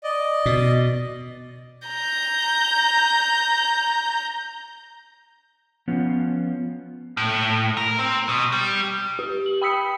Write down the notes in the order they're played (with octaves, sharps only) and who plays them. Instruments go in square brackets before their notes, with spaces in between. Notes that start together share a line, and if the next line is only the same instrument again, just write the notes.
[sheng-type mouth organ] D5 D#5
[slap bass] B2
[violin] A#5 G6
[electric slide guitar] F3 B3 C#4 F4
[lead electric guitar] A2
A#4
C4
B2
G3
[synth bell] G4
F#7
G5 B5 D#6 E6 B6 C#7